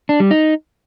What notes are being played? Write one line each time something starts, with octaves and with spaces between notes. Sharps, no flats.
D4
G3
D#4